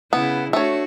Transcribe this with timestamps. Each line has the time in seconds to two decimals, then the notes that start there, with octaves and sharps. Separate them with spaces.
0.13 C#3 B3 E4
0.53 A3 D4 F#4 C#5